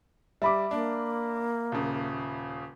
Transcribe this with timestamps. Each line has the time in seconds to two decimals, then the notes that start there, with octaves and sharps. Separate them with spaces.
0.42 G3 E5 B5 D6
0.71 A#3 D4
1.72 D#1 C#3